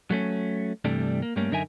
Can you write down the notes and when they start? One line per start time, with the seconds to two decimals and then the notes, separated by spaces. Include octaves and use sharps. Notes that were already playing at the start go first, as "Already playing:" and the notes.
0.10 F#3 A3 C#4
0.85 G2 C3 E3 G3 A3 D4
1.22 A#3
1.36 G2 G3 A3 A#3 C#4
1.51 F#2 D3 D#4 A#4 E5 G#5